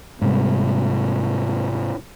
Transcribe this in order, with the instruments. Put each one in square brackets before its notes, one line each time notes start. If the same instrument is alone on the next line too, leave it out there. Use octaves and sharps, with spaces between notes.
[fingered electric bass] G#2 C3 G3